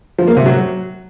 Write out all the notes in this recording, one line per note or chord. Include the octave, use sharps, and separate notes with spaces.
F3
A#3
C3
F#3